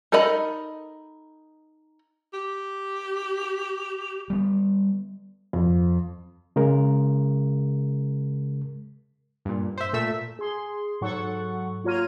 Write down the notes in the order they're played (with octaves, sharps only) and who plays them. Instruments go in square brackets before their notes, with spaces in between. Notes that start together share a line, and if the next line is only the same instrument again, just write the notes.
[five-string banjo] D#4 A4 A#4 D#5 B5
[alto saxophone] G4
[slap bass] G3 B3
[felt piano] F2
[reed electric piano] C#3 G#3 A#4
[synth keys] G2 A#2
C5 E5
A#2 A3 E5 E6
[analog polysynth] G#4 C6
G#2 F#3 A4 F#5 C#6
A#3 F4 C#5 A#5 F6 D#7